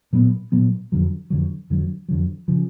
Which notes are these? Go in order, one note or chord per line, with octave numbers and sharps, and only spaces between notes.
A#2 F#3 B3
A#2 F#3 B3
F2 D3 F#3
F2 D3 F#3
F2 D3 F#3
F2 D3 F#3
C#3 F3